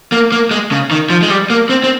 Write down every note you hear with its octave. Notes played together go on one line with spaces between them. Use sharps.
A#3
A#3
G#3
C#3
D#3
F3
G#3
G3
A#3
C4
C4